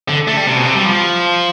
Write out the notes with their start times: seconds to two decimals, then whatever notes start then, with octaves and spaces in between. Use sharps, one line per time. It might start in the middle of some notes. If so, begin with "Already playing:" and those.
0.09 D3
0.28 A3
0.37 G3
0.47 C3
0.56 B2
0.65 C3
0.75 G3
0.85 F3